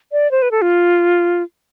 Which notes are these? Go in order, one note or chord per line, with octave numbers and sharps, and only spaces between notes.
D5
C5
B4
A4
F4